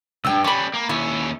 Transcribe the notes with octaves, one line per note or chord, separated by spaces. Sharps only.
C#2 G2 G5 E6
G3 C#4 B5 D6
A#3
D#2 C#4 E4